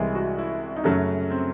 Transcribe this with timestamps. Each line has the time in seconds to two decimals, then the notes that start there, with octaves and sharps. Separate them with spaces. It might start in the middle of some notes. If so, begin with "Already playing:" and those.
Already playing: C2 C3 E3 G#3
0.15 F#4
0.38 E4
0.76 D#4
0.84 F#2 C#3 F#3 A3 C#4
1.31 C4